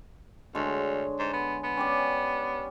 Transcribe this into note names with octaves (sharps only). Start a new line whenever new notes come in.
D2 D3 G#3 C#5
G#2
B3
B3
C#4 G4 D5